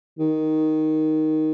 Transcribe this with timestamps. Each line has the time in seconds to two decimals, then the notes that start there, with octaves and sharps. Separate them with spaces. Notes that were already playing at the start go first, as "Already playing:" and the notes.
0.19 D#3